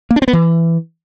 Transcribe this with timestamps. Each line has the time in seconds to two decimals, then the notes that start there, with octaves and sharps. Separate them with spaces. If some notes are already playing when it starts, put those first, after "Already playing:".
0.11 A#3
0.16 D4
0.22 C4
0.28 B3
0.33 E3